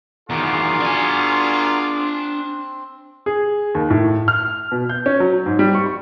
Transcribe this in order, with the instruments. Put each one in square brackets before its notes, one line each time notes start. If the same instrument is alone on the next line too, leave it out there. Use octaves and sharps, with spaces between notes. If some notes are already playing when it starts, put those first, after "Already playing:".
[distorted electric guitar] E2 D#3 [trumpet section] F4 G#4 [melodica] F#4 A#4 D5
[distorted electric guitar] D4 G#5
[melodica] C4
[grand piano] G#4
D#2
A2
F6
B2
G6
C#4
F#3
G#2
G3
C#6
C#6